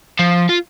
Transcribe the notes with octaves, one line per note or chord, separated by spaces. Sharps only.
F3
F4